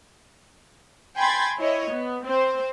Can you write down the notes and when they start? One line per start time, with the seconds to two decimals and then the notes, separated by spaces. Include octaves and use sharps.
1.16 G5 G#5 B5 C6 G#6 A6
1.59 E4 C#5 D#5
1.91 B3
2.24 C4 C5